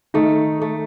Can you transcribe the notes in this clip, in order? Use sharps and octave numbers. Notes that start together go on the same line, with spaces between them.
D#3 A3 D#4
A3